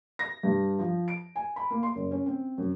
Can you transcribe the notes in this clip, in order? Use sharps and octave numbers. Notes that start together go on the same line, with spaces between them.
A#6
G2
F3
D7
G#5
B5
A#3
C6
F#1
C#4
C4
F#2